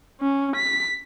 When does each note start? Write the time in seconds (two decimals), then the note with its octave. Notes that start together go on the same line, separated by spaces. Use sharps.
0.21 C#4
0.56 B6